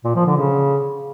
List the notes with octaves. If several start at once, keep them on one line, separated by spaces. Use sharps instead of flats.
A#2
F3
D3
C#3